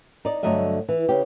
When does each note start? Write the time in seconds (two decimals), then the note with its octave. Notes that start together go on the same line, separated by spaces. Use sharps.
0.25 D#4 D5
0.43 G2 D3 F#3 A3 D#5 E5
0.88 E3
1.09 C#3 G4